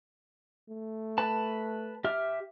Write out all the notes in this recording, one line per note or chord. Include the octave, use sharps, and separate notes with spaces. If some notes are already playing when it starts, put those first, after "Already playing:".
A3
B4 A5
G4 E5 F6